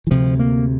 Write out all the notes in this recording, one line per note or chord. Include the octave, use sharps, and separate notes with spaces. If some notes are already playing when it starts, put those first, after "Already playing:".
E3
D2 C3 F3
A#3